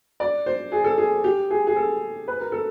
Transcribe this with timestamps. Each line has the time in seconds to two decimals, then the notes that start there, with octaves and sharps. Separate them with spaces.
0.20 D5
0.46 C5
0.72 G#4
0.84 A4
0.98 G#4
1.24 G4
1.50 G#4
1.67 G#4
1.76 A4
2.28 B4
2.40 A#4
2.52 A4